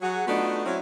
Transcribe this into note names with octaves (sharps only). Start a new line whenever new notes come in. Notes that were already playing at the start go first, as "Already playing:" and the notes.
F#3 F#4 G#4
A3 B3 D4 D#4 F4 F#4
F#3 C4 C#4 E4